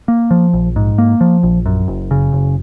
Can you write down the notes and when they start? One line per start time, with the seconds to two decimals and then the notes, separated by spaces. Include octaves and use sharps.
0.08 A#3
0.31 F3
0.53 A#1
0.76 G#2
0.98 A#3
1.21 F3
1.43 A#1
1.66 F#2
1.88 F#1
2.11 C#3
2.33 F#1